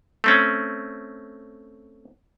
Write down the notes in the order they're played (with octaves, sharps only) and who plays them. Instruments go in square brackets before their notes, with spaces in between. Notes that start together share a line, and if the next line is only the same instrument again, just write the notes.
[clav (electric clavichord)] A3 C4 C#4